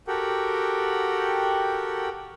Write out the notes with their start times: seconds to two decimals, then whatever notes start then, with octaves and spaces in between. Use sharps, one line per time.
0.08 F#4 G4 A4 A#4 F#5 G5